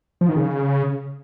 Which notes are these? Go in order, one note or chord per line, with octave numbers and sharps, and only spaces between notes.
F3
D#3
C#3